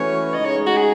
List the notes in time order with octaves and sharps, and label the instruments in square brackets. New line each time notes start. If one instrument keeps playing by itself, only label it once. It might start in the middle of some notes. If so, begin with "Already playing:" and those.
Already playing: [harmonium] E3 A3 C#4 F#4 B4 [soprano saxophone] C#5
[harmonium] C#3 G#3 D#4 [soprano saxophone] D#5
[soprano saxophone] C#5
F#4
G#4